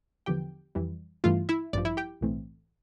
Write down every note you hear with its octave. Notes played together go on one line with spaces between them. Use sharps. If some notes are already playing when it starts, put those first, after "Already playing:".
E2 D3 F3 B3 G4 G5
F2 E3 G3
G2 E3 A3 F4 F5
E4 E5
A1 G2 F3 D5
E4 E5
G4 G5
B1 A2 E3 A3 C4